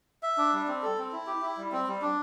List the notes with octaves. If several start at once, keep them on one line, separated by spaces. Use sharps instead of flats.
E5
D4
G3
C4
A4
C4
E4
G4
E4
G3
C4
G3
D4